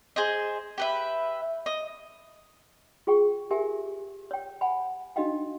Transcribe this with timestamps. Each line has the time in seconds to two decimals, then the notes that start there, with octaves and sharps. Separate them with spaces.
0.16 G#4 C5 D#5
0.78 G4 B4 E5
1.66 D#5
3.07 F4 G#4 G5 C#6
3.51 G4 A#4 E5 G#5
4.31 C#5 G5
4.61 F#5 G#5 B5
5.16 D4 D#4 F#4 D#5 F5 G5